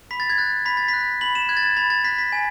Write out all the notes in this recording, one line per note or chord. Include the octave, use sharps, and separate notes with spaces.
B5 B6
A6
G#6
F#6 A6
B5 B6
A6
B6
F#6
B5 F#7
E7
F#6 G#6
A6
G#6
B5 A6
A6
F#6 B6
B6
G#5